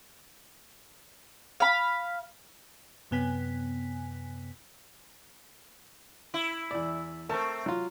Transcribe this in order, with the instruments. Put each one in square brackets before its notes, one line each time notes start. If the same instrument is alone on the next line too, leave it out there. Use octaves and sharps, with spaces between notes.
[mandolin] F5 B5
[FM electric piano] F#2 C3 B3 G#5 B6
[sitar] E4
[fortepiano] E2 D5
[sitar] A3 C4 [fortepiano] A#4 A5
[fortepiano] F#3 F4